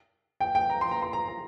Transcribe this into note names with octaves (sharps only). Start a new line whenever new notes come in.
G5
G5
A#5
C6
A#5
C6
A#5
A#5